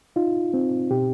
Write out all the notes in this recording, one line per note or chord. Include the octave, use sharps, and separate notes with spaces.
D#4 F4
C4
B2 G4